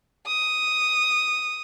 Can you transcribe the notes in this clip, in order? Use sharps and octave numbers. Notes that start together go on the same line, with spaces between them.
D#6